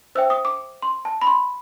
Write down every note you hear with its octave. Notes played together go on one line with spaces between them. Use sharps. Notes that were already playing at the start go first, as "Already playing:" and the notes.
C5 E5 G5 E6
D#6
D6
C6
A5
B5
C6